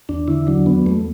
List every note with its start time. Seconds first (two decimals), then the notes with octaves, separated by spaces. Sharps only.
0.09 E2 D4
0.28 D3 E4
0.47 F#3 D4
0.66 E2 B3
0.86 E2 A3